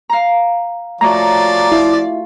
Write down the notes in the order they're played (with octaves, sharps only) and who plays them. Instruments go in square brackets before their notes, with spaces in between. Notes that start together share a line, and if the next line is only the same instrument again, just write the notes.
[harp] F5 A#5
[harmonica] F3 D5 [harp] A3 F#4 C#5 [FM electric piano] A#5
[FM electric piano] E4 [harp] F4